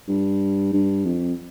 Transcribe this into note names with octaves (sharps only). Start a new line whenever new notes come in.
G2
G2
F2